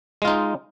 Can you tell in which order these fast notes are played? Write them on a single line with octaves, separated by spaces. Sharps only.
G#3 F4 D#4